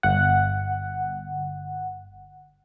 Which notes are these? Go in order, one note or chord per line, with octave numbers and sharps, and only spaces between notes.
G1 F#5